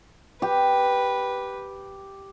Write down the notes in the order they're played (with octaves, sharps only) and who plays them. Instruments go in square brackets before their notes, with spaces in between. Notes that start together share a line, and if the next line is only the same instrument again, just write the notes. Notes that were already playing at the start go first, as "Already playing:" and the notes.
[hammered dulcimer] G4 [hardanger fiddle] B4